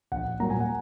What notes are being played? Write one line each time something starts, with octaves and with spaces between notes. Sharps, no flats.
A#1 F#5
A#2 F#3 A#3 A#5
G#5
F#5